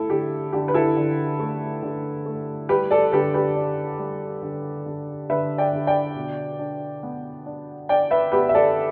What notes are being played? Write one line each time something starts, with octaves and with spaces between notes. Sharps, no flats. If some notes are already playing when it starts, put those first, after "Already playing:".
Already playing: A3 E4 A4
D3 G4
D3 G4
B4
E4 A4
D3
A3
D3
A3
G3 G4 B4
A4 D5
D3 G4 B4
G4 B4
D4
G3
D3
D3
D3 B4 E5
D5 G5
D3
D5 G5
B2
D4
B3
D4
D4 D5 G5
B4 E5
B3 G4 B4
E5
A4 D5